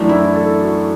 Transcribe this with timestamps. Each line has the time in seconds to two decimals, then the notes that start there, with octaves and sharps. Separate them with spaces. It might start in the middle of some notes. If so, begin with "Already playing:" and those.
Already playing: F#2 E3 A3 D4
0.09 E4
0.35 A4
0.61 F#4